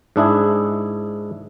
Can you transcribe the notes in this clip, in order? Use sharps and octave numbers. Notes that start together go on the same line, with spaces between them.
G#2 D4 E4 G#4